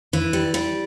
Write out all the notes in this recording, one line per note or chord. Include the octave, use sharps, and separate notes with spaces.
E3
G3
G3